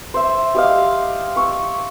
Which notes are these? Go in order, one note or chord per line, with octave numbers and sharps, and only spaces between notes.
C5 E5
G4 D#5 F5
C#6 E6